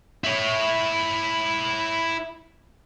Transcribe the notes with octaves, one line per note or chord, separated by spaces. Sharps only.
E4 C#5